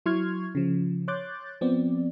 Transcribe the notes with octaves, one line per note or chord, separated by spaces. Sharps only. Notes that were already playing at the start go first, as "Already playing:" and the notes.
F#3 E4 C6 C#6 F6 G#6
C#3 F3
C#5 C6 D6 F#6 G6 A6
F3 B3 C4 D5